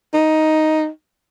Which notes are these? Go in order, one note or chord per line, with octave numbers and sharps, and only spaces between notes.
D#4